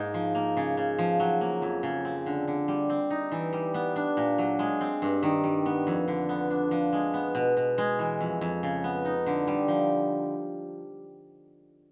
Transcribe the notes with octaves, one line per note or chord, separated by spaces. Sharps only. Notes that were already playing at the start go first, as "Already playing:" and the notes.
Already playing: G#2 A#3 D#4
F3
A#3
C#3
C#3
F3
F#3
A#3
F2
C#3
C4
D3
D3
G3
C4
D#4
E3
G3
B3
D4
A#2
F#3
G#3
C4
G2
D#3
G3
B3
F2
D3
B3
D4
F3
G#3
B3
B2
B2
G#3
E3
F2
F2
C#3
B3
D#4
D3
G3
F3